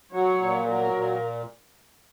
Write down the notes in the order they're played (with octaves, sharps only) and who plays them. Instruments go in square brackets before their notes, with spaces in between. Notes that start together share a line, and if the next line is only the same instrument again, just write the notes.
[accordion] F#3 [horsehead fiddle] C#5
[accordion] A#2
[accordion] F#3 [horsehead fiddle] A#4
[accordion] A#2